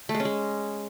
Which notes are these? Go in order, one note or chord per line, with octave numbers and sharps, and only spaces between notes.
A3
G#3
C#4
G#3